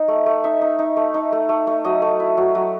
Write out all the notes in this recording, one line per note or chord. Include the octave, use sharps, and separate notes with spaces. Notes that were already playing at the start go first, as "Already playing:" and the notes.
Already playing: D#4
A3
A3
D#4 E5
D#4
D#4
A3
D#4
A3
A3
A3
F#3 D#5
A3
E4
F#3
F#3